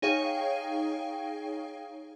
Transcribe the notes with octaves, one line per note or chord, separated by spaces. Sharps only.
D#4 G#4 C#5 F5 G5